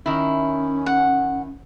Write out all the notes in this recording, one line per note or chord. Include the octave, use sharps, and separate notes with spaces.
D#3 C#4 E4
F#5